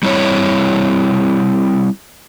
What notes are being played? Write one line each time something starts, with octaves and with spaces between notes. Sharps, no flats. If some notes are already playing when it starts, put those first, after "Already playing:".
G3 C4 E4 C#5